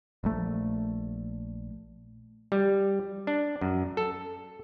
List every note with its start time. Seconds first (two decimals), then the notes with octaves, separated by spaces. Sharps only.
0.24 A#1 A3
2.52 G3
3.27 D4
3.61 F#2
3.97 A4